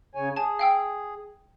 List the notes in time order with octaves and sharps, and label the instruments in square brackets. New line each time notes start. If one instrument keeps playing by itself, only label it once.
[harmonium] C#3 C#5 G#5
[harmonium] G#4 [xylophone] G#5 A5
[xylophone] F5 G5 E6